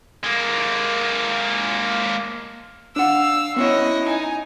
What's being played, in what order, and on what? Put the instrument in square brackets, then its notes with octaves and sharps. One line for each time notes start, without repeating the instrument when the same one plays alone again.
[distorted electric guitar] G#3 A#3
[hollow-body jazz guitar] D4 F#5 [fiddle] F5 E6
[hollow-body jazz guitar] B3 C#4 E4 [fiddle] F#4 D#5
[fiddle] D#4 G#5